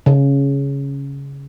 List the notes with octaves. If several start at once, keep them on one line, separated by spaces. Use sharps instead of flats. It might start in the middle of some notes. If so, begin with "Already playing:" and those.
C#3